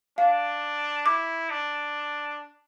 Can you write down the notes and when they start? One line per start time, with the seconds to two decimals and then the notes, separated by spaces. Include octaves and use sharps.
0.18 D4 F5
1.06 E4 D6
1.50 D4